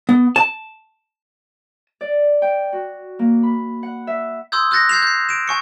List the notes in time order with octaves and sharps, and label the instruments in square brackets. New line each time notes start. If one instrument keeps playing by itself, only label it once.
[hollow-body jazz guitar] B3
A5
[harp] D5
G5
F#4
A#3
B5
F#5
E5
[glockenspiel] C6 D#6 E6 G6 G#6
D#6 F#6 G6 A6 A#6 C#7
G6 G#6 C7 E7 F7
G6 C7
D7 E7
G#5 C#6 C#7